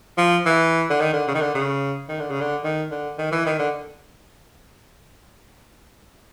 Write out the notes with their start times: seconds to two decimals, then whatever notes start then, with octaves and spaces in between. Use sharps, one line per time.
0.18 F3
0.46 E3
0.90 D3
1.00 D#3
1.13 D3
1.28 C#3
1.35 D#3
1.41 D3
1.55 C#3
2.09 D#3
2.19 D3
2.30 C#3
2.41 D3
2.64 D#3
2.91 D3
3.18 D#3
3.32 E3
3.46 D#3
3.60 D3